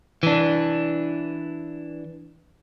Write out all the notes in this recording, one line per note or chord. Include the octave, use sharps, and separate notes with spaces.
E3 D4